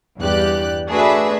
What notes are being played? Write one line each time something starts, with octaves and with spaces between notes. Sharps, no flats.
E2 G2 G4 D5 F#6
A3 D4 F#4 G#4 B4 E5